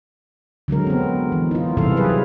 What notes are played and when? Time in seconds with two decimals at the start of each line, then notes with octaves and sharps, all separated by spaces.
0.68 D3 F#3 G#3 A#4
0.87 B3 C4
1.32 E3
1.51 D#4 F4
1.77 C3 E3 G3 A4 F5
1.96 F#3 G#4 B4